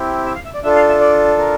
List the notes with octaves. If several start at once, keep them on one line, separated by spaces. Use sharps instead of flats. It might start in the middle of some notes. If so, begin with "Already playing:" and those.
Already playing: C4 E4 G4
E5
F5
E5
D5
D4 F4 A4 E5
F5
E5
D5
A#4